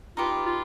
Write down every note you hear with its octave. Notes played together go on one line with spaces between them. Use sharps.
D#4 F4 G4 B4
F4